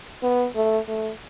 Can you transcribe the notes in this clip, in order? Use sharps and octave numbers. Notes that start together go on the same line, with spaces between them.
B3
A3
A3